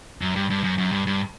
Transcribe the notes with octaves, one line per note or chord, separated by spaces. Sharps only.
F#2
G2
G2
F#2
F#2
G2
G2